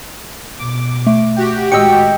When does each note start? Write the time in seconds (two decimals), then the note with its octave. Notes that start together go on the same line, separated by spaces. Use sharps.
0.59 B2 D6
1.07 A3
1.36 F#4 G4
1.72 A2 D#3 G#3 D#5 G5 E6 C#7